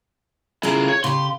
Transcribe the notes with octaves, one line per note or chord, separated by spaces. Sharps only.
C#3 E4 F4 G#4 A#4
C#5
C#3 G4 C6